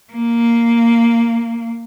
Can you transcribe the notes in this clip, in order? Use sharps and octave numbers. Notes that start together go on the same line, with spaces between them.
A#3